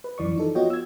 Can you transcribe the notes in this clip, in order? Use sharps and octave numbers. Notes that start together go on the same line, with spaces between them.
B4
F#2 E3 D5 C#6
F3 D#4 A4
B3 F4 F#4 C#5 D#5 G5
E6 G#6